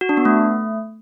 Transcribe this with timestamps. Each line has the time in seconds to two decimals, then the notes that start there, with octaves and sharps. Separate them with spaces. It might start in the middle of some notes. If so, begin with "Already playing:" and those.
0.01 F#4
0.09 D4
0.17 B3
0.25 A3